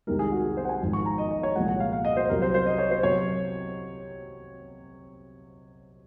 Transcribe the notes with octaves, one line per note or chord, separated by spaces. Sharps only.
C2 C3 D#3 G#3 A#4
G#4
F#4
G#4
C5
F#5
G#5
G#1 G#2 F3 G#3
C#6
A#5
D#5
D#5
C#5
C2 A#2 F3 G#3 F#5
F#5
F5
F5
D#5
C5
C2 C3 F#3 A#4
C5
C5
D#5
C#5
C5
C3 F#3 C#5